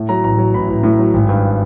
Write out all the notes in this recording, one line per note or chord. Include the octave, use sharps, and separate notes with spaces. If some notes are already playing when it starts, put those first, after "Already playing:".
Already playing: A2
F#3 A#5
A1 A#5
F#3
A1 B5
A1
A2
F#3
G#1
G2